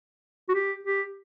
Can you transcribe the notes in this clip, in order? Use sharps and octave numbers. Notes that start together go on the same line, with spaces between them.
F#4
G4
G4